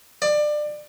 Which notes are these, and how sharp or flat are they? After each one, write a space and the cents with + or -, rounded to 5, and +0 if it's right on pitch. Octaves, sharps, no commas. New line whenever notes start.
D5 +25